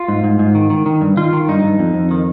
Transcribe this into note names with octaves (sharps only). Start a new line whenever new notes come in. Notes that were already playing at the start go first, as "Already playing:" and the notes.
Already playing: F4
G#2
G#2
G#2
D#3
D#3
D#3
G2
D#3 F4
D#3
G2 D#4
G2
F2
F2
D#3